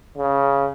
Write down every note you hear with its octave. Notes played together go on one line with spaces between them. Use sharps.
C#3